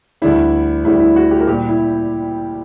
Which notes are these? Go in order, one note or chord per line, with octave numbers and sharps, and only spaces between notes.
D2 D3 G3 E4
D2 D3 G3 E4
E4
F#4
G4
A#4
A#2 G3 G4
E4